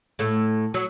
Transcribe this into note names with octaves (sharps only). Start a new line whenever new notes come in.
A2 A3
F#3